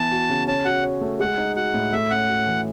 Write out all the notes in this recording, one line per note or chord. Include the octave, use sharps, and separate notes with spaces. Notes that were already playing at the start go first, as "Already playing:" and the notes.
Already playing: E3 B3 A5
F#4
C#3
C#4 A5
F#4 F#5
C#5
A3
G#3 F#5
D#4
F#4 F#5
A2
A3 E5
C#4 F#5
F#4
E3